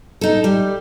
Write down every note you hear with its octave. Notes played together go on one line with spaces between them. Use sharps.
D#4 A4
G3